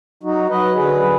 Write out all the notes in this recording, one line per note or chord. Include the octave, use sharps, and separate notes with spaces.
F#3 D#4 F#4
F#3 B4 D#5
D3 G#4 B4
D3